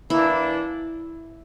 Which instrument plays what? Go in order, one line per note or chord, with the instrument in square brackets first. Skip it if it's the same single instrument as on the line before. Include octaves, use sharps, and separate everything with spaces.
[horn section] E3 A#3 D4 [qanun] E4